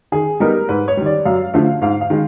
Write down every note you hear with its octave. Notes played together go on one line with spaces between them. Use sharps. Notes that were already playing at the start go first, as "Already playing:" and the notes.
D#3 G#4
G3 B3 D#4 A#4
G#2 B4
C#5
D#3 G3
D5
F#2 F5
D3 F3 A3
G#2 F5
F5
D#3 G#3